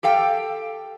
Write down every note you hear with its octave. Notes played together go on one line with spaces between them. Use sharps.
G4 A4 F5 G5